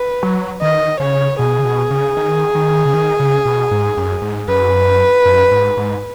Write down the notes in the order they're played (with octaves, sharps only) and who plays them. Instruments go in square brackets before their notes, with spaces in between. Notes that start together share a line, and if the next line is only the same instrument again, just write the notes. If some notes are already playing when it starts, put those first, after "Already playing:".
Already playing: [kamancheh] B4
[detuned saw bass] F#3
[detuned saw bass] D#3 [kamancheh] D#5
[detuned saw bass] C#3 [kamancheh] C#5
[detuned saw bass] B2 [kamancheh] G#4
[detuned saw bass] C#3
B2
C#3
D#3
D#3
C#3
D#3
C#3
B2
G#2
F#2
G#2
[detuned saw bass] F#2 [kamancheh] B4
[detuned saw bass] F#2
G#2
G#2